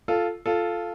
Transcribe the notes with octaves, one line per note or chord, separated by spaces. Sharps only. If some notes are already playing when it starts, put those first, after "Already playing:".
F4 A4
F4 A4